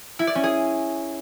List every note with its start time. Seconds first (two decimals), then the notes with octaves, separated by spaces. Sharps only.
0.19 E4
0.27 D5
0.35 C#4
0.43 G#4